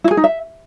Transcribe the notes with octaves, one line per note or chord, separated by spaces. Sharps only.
E4
G#4
D#4
E5